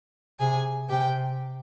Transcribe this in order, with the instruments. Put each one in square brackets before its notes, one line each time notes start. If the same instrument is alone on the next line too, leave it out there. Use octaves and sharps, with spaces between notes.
[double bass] C3 [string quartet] G#4 G#5
[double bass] C3 [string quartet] G4 G5